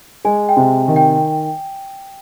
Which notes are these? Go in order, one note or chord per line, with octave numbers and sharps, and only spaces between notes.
G#3 G#5
G5
C3
D#3
G5